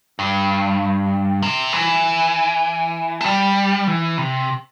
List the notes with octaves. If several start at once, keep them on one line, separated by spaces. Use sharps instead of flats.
G2
C3
E3
A3
G3
E3
C3